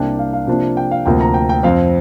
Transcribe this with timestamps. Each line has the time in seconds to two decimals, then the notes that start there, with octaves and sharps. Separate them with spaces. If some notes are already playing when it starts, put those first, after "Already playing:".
Already playing: C2 C3 A#3 D4 G5
0.19 F5
0.33 F5
0.47 C3 F3 A#3 D4
0.77 G5
0.91 F5
1.06 D2 C3 F3 A#3 G5
1.21 A#5
1.34 G5
1.49 G5
1.63 F2 F3 C4 F5